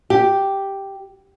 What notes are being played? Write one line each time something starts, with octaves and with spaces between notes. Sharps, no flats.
G4